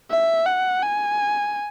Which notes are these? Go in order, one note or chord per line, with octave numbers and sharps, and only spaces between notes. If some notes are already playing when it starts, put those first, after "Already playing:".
E5
F#5
G#5